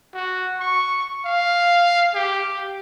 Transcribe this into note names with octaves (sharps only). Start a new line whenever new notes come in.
F#4
C#6
F5
G4